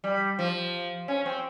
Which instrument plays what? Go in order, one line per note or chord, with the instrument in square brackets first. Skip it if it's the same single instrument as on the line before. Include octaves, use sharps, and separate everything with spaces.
[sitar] G3
F3
C#4
C4